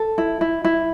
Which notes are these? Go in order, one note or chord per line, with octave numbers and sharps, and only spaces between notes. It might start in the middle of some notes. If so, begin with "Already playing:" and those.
Already playing: A4
E4
E4
E4